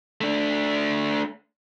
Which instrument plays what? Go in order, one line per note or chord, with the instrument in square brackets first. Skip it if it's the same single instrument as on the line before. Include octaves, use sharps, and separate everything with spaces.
[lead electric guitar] A3 D4